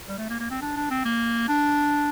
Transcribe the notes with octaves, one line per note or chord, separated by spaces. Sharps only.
G3
A3
A#3
A#3
C4
D4
D4
C4
A#3
D4